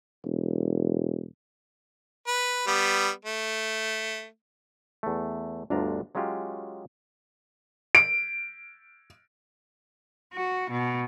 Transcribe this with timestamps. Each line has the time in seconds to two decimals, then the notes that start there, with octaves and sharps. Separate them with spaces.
0.25 E1
2.28 B4
2.67 G3 B3
3.25 A3
5.03 E2 A3
5.70 G1 D2 D4 F4 A#5
6.15 F#3 G#3 C#4 F4 G4
7.95 D7
10.33 F#4
10.70 B2